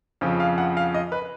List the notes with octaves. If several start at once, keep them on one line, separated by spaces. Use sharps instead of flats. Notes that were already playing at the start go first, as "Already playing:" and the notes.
F2 C#3 F3
F5
F#5
F5
D#5
B4